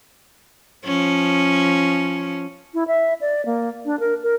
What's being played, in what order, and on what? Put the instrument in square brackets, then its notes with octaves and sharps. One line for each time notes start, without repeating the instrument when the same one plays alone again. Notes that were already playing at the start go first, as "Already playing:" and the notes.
[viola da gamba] F3 C#4
[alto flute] E4
E5
D5
A#3
D4
A#4
A#4